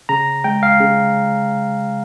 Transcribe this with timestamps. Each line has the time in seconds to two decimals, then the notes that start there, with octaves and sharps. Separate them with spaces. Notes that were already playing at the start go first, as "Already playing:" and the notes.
0.09 C#3 A#5
0.44 G#3 G5
0.63 F5
0.80 C#3